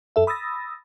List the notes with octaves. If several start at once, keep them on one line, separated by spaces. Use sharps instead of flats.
F#2 A4 E5
B5 D#6 E6 A6 A#6